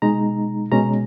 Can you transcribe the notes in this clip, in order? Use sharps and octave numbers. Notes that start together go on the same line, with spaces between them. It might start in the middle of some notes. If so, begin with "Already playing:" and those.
B2 G#3 D#4 A#5
B2 G#3 C#4 A#5